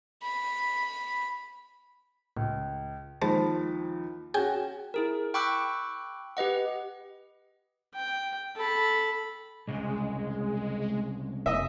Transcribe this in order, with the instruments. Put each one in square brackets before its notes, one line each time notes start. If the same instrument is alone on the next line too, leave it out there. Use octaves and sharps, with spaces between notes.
[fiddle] B5
[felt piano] C#2 [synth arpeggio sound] A2
[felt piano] D#2 F3 B5 [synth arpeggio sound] G#3 C5 A5
[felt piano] C#4 F#4 [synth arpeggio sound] G#4 G5 G#5
[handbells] E4 G#4 A#4
G5 B5 C#6 D6 E6 F#6
G4 B4 D#5 F#5
[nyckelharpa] G5
A4 B5
[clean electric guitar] C2 C#3 [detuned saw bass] G#3
[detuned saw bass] F1 [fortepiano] D#5 E5